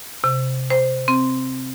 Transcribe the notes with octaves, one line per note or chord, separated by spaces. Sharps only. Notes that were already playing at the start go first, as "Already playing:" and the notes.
C3
C5
C4